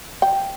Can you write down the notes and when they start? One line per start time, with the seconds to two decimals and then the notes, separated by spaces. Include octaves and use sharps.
0.22 G5